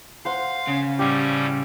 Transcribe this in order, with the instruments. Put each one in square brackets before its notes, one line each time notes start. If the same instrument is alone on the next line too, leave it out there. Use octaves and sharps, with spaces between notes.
[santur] C5 F#5 C6 [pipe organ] F5
[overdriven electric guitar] C#3
[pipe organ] A2 G3 C#4 [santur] G4